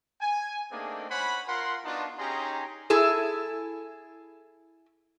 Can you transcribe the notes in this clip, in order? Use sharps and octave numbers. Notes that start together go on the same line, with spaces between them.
G#5
A3 A#3 C4 D4 D#4 G#4
C5 C#5 F#5 G#5 B5
F4 A#4 F#5 C6
B3 D4 D#4 F4 F#4 A5
C#4 D#4 G4 G#4 A#5 C6
E4 G#4 A4